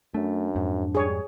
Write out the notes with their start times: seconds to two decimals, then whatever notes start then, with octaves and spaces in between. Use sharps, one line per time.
0.14 F#2 A3 D4
0.56 F2 G#2
0.95 G3 G#4 C#5